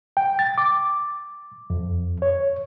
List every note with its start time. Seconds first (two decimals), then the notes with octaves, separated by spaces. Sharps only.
0.17 G5
0.39 A6
0.58 D6
1.70 F2
2.22 C#5